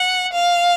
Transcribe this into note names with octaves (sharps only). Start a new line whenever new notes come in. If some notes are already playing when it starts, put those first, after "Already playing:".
Already playing: F#5
F5